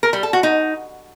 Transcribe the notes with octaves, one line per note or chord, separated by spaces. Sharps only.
A#4
G3
A4
F#4
D#4